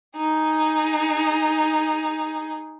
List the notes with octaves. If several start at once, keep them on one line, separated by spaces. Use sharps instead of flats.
D#4 G#4